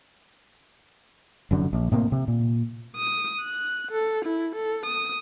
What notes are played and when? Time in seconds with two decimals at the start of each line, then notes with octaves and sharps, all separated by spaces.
1.51 F1 F#2 D3
1.73 A#1
1.92 A2 C3 A#3
2.12 C3
2.28 A#2
2.96 D#6
3.41 F#6
3.91 A4
4.25 E4
4.56 A4
4.85 D#6